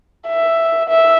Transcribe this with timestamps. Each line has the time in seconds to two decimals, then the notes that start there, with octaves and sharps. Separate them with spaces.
0.28 E5
0.89 E5